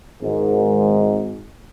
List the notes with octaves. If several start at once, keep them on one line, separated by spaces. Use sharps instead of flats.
G#1 G#2